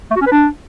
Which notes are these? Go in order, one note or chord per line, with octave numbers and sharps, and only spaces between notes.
A3
F#4
C#4
B4
D4